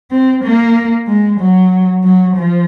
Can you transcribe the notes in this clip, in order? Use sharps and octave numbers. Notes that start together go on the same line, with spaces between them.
C4
A#3
G#3
F#3
F#3
F3